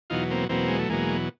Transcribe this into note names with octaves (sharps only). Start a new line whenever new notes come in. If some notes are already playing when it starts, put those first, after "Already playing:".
E2 B2 F#3 D#4 F4
A#3 C4
E2 B2 F#3 A#3 C4
G#3
A3
E2 B2 F#3 G#3 A#3